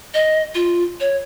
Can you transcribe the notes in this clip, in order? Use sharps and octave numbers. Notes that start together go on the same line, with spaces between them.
D#5
F4
C#5